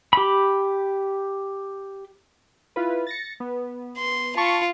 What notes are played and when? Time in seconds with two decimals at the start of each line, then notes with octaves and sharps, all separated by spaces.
0.13 G4 B5
2.76 E4 F4 B4
3.07 A6 A#6 C#7
3.40 B3
3.97 C6
4.37 F4 A5 B5 C#6